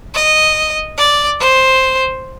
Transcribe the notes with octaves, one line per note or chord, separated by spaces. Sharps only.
D#5
D5
C5